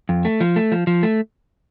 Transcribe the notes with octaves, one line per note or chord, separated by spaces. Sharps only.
F2
A3
F3
A3
F3
F3
A3